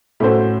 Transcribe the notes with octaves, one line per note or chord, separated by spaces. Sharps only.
A2 A3 C#4 F#4 C5